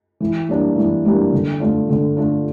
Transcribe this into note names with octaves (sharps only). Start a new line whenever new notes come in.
E3
G3 A#3 D4
E3
G3 A#3 D4
D3
A3 D4 F4
D3
A3 D4 F4